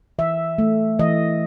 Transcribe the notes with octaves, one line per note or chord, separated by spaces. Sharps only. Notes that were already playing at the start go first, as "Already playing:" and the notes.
E3 E5
A3
E3 D#5